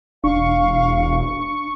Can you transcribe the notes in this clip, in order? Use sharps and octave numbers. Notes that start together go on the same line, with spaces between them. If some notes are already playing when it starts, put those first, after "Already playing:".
E1 D4 F5 C#6